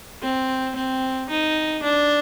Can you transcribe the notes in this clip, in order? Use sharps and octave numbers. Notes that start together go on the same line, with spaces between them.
C4
C4
D#4
D4